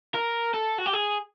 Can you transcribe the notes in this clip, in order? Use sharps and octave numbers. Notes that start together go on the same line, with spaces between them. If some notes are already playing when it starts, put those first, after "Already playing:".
A#4
A4
F#4
G4
G#4